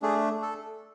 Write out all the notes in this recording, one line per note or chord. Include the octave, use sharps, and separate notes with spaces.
A3 D4 G#4
A4